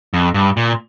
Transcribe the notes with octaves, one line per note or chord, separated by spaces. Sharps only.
F2
G2
A#2